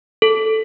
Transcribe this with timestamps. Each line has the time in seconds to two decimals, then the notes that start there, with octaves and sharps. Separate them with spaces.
0.22 A4